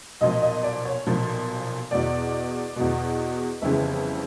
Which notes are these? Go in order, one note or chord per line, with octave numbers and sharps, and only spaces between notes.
B1 A#2 F3 D#5
D#5
D5
C#5
B1 A#2 F3
E2 B2 D5
E2 B2
G1 F2 C#3 E3 E5